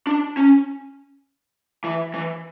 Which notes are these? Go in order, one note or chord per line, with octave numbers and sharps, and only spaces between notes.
D4
C#4
E3
E3